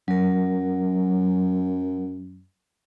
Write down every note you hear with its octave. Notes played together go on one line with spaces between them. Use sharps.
F#2 F#3 A#4